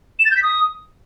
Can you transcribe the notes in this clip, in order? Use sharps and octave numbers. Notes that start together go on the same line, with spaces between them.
E7
A6
G6
B6
D#6